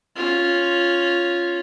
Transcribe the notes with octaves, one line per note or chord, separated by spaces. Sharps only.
C#4 F4